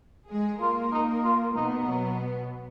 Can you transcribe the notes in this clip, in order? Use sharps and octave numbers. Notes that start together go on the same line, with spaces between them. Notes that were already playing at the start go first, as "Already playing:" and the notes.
G#3 G#4
A#3 F4 A#4
D#4
F4
B2 B3 D#4
F#3